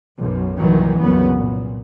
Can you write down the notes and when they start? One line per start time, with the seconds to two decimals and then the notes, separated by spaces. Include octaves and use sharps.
0.18 B1 F#2
0.58 C2 F#2 A#2 D#3 E3 F#3
1.00 F#1 C2 F#2 C#3 B3
1.34 A#2